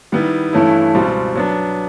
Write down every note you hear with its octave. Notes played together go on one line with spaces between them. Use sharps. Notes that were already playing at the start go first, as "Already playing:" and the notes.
D#3 G3 B3 E4
G2 E3 A3 C#4 E4
C#2 B2 G3 C4
F#3 B3 D4